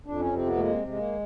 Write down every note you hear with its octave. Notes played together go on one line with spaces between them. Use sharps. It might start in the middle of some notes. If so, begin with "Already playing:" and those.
F2 D4
C#4
C3 C4
B3
A3
G#3 A#3
G#3
A#3